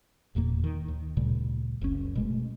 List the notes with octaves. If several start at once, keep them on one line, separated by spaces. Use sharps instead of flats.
F1 E2 A#2 A#3
D#3
D#2
D2 A#2 C#3 G3
F#1 C#2 C#3 C#4
B2 G#3 A3